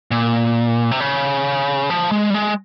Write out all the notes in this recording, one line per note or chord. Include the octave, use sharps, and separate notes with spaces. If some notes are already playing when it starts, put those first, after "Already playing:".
A#2
C3
C#3
F3
G#3
G3
G#3